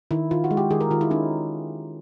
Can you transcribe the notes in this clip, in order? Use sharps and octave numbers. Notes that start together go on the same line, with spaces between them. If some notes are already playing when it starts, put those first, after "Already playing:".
D#3 E4
D#3 F4
F#4
G#3
G4
D#3 G#4
A#4
D#3 F4
E4
C#4 D#4